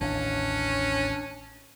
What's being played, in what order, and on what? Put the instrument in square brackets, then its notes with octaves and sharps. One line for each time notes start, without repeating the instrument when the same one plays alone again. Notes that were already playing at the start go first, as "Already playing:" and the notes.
[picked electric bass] A1 D#2 [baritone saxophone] C#4 [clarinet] D4